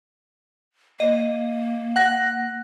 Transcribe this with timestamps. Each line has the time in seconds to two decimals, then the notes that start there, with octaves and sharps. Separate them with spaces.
1.00 A#3 D#5
1.96 F#5 F#6 A#6